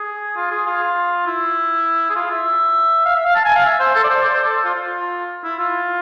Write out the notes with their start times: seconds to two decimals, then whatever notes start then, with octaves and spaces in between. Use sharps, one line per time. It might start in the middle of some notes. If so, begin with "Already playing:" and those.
Already playing: G#4
0.36 F4
0.51 G#4
0.66 F4
1.26 E4
2.10 G#4
2.15 F4
2.30 E5
3.05 F5
3.15 E5
3.25 F5
3.35 A5
3.45 G#5
3.55 F5
3.65 E5
3.79 C5
3.95 A4
4.04 D5
4.10 C5
4.25 D5
4.34 C5
4.44 A4
4.64 F4
4.74 F4
5.44 E4
5.59 F4